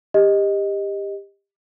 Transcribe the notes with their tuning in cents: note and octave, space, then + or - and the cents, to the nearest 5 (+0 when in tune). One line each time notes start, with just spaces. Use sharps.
G4 +20 D#5 +0